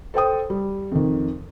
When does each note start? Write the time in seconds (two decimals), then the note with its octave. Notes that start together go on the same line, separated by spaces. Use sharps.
0.14 A4 C5 G5 D#6
0.50 G3
0.92 F2 D#3